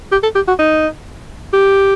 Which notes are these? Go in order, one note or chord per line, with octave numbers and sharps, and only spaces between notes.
G4
A4
G4
F#4
D#4
G4